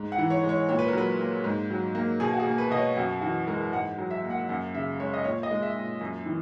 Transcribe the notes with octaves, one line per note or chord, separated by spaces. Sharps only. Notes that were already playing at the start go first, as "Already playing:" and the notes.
Already playing: G#2
F#5
E3
C#5
G#3
C#5
A#2 C#5
B4
A#4
F#3 B4
A#3
G#2
F#3
A#3
B2 G#4
F#4
G#4
A#3
B4
B2 D#5
C#5
F#2 F#4
E3 F#4
G#3 A#4
G#2 F#5
F#3
E5
A#3
F#5
F#2 F#5
C#3 E5
G#3 C#5
D#5
A#2 C#5
D#5
G#3
E5
A#2
F#2
E3